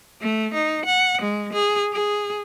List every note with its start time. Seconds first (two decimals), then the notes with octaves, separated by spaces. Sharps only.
0.21 A3
0.54 D#4
0.86 F#5
1.22 G#3
1.53 G#4
1.93 G#4